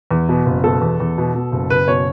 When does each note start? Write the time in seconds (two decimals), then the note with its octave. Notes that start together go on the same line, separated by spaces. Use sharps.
0.11 E2
0.29 B2
0.46 F#1
0.64 B2 A4
0.81 E2
1.00 E2
1.18 B2
1.35 B2
1.52 F#1
1.70 F#1 B4
1.88 B2 C#5